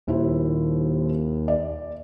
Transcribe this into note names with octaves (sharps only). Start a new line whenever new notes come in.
D#1 D#2 E4 C5
D5